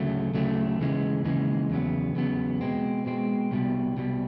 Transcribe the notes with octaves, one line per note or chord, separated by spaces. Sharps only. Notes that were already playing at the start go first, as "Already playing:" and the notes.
Already playing: D2 C#3 F#3 A3
D2 C#3 F#3 A3
D#2 C#3 E3 G#3
D#2 C#3 E3 G#3
E2 C#3 F#3 B3
E2 C#3 F#3 B3
B2 G#3 C4
B2 G#3 C4
C2 B2 G3
C2 B2 G3